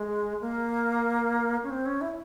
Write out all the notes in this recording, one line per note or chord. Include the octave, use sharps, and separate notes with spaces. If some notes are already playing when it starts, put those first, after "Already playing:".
Already playing: G#3
A#3
C#4
C4
C#4
E4